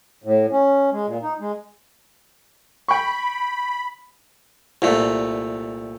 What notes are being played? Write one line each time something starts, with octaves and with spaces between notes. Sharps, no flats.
A2
C#4
G#3
A#2
D#4
G#3
G5 B5 C#6
C2 A#2 A3